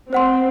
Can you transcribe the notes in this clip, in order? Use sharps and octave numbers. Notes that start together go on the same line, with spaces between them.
C4 C5 F#5 C6